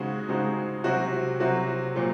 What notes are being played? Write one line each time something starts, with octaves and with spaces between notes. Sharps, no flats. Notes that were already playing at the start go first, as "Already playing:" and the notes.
Already playing: C#3 G#3 C4 D#4 F#4
C#3 G#3 C4 D#4 F#4
C3 F#3 C4 F#4
C3 F#3 C4 F#4
A#2 F#3 C4